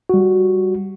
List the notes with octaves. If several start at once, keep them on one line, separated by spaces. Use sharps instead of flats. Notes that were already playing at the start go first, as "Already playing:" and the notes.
G3 F#4